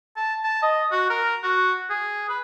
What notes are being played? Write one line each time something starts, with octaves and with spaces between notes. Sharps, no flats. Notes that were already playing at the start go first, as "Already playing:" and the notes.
A5
A5
D#5
F#4
A#4
F#4
G#4
B4